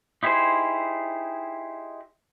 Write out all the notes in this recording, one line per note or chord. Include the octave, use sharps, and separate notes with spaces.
D#4 E4 G4 G#4 C5